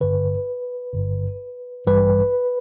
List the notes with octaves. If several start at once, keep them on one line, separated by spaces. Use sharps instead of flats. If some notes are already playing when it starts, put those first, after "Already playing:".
G1 G2 D3 B4
G1 G2 D3
A1 G2 E3 G3 B4